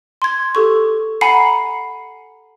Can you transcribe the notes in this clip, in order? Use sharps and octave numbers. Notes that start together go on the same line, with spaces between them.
C6 G#6
G4 A4 C#6
F#5 G#5 A#5 B5 C7 C#7